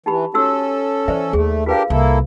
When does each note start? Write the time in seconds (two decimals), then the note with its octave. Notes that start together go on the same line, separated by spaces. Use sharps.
0.06 E3 D#4 G4 B5
0.34 C#4 D#4 F#4 A4 E6
1.08 E3 C5 D5 E5
1.33 D#2 A3 G#4
1.66 D4 F4 G4 A#4 B4 F5
1.90 C2 A#3 E4 A4